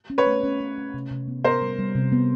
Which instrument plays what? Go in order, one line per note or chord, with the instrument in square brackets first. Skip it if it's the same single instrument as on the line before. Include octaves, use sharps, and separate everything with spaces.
[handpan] C#4
[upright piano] B4 C#5
[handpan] A3
C#4
C#4
C#4
C3
C3
B3
[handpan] B3 [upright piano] A#4 C5
[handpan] G3
G3
C3
B3